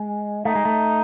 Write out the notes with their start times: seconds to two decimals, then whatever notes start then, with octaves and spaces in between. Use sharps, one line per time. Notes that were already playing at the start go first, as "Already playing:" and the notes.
Already playing: G#3
0.45 A3 D#4
0.55 G#3
0.65 A3